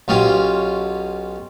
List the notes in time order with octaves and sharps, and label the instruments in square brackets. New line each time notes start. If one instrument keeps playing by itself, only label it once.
[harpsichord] B1 C#4 F4 G4